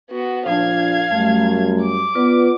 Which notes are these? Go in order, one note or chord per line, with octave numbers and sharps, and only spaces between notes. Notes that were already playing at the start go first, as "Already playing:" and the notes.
B3 F#4
A#2 F3 D4 F5 G#6
F#2 G3 A3
D6
B3 F4 B4 D5